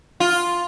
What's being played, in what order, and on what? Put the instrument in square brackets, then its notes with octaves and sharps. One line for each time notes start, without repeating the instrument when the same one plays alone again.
[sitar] F4